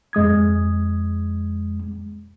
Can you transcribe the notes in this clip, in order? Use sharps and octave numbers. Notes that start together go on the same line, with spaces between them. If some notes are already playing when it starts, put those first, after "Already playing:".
F2 G#3 D#6 G#6